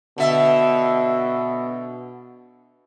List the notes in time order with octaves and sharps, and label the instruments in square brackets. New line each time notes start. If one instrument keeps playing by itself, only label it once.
[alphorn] B2 [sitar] D3 E5